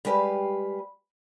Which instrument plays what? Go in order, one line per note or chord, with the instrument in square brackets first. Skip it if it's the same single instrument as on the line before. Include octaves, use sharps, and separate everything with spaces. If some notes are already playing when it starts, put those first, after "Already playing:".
[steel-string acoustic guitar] G3 G#3 G4 B4 D#5 F5